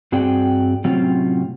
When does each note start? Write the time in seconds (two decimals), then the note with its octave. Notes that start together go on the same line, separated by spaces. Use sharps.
0.12 G2 C4 F#4 G#4 D5 G5
0.84 A2 C3 F#3 C4 C#4 F4